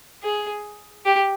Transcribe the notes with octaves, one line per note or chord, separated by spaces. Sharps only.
G#4
G4